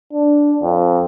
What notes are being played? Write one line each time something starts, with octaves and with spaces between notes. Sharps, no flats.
D4
F2